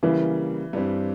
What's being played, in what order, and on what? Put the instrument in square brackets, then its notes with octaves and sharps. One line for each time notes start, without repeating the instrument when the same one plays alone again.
[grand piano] C#3 G3 A#3 [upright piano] E3
[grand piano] G2 E3 G3 C4